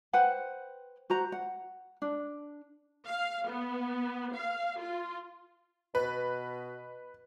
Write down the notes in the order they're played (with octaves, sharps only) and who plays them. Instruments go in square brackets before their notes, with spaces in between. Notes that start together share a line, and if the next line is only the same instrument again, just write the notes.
[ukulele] B4 C5 F#5 G5
F#4 C5 A#5
F#5
D4
[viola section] F5
B3
F5
F4
[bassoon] B2 [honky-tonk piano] B4